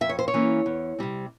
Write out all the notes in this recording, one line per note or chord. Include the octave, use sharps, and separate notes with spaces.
F2 E5
C#5
C5
C#5
E3 A#3 C#4
E2
C3 G3 C4